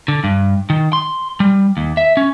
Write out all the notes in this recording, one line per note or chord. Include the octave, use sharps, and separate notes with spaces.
D3
G2
D#3
C6
G3
D#2
E5
C#4